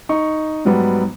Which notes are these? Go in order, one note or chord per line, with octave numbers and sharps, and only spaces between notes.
D#4 C#6
G#2 F#3 G3 B3